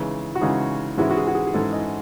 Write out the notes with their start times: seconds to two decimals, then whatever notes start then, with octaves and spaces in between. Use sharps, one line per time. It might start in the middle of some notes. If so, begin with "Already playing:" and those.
Already playing: C#3 E3 G#3 D#4
0.35 F#4
0.41 C#3 E3 G#3 D#4 G#4
0.97 G#2 E3 G#3 C#4 E4 F#4
1.11 F#4
1.17 G#4
1.27 F#4
1.35 G#4
1.47 G#4
1.53 G#2 E3 G#3 C#4 E4 A4
1.73 D#5